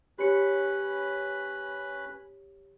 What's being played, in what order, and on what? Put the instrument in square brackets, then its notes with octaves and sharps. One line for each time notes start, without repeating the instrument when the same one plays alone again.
[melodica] C#4 B4 B5 [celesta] G4 C#5 C#7